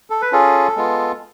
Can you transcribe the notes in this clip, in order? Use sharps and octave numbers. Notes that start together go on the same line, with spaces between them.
A4
B4
C#4 F4 G#4 A4
G#3 B3 F4